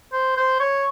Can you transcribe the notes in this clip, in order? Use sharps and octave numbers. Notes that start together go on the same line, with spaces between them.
C5
C5
C#5